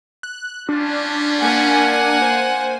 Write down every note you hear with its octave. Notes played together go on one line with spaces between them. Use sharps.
F#6
G3 C#4 D4 F4
A#3 F#5 G#5
C5